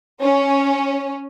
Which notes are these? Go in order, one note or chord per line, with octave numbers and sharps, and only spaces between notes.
C#4